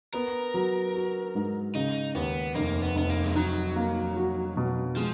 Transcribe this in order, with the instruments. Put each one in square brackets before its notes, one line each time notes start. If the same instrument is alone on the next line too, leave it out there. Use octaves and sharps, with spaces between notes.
[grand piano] B3 [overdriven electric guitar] A#4
[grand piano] F#3
F#4
G#2
[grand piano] C#3 [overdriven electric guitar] D#4
[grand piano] D#2 [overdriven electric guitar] B3
[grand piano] F1 [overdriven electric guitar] A#3
[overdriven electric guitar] B3
[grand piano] F1 [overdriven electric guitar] B3
[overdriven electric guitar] A#3
G#3
[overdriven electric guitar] F#3 [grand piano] D#4
[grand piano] A#3
F#4
B2
[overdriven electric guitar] F3 [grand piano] G#3